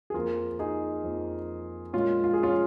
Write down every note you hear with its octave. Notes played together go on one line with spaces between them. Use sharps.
G#4
F2 F3 A#3 F4 A#4
D#4 G#4
F2 F3 A#3
A#2 G#3 C#4 F4
F4
G#4
C#4 F4